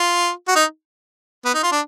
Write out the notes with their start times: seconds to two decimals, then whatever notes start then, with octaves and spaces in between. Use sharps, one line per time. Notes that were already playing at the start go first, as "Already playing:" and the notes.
Already playing: F4
0.47 F#4
0.55 D#4
1.45 B3
1.54 D#4
1.63 F4
1.72 D4